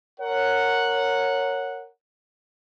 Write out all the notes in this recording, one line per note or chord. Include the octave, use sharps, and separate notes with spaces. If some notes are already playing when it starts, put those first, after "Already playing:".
A#4 C#5 F#5